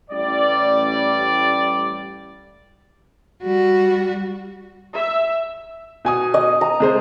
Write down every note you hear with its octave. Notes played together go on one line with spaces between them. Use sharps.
A1 G3 D5
G3 F#4
E5
B2 G#5 D#6
D#5
A#5
C3 G#3 C5